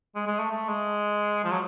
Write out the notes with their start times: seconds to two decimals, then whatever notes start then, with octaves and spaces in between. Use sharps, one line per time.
0.15 G#3
0.27 G#3
0.39 A3
0.51 A3
0.69 G#3
1.44 F3
1.51 F#3